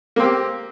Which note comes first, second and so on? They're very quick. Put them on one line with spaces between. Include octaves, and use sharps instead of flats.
A#3 C4 G4